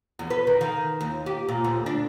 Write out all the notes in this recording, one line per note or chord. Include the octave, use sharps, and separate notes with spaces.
E2
B4
D#3
D#3
D#2
G4
A#2
D2
D4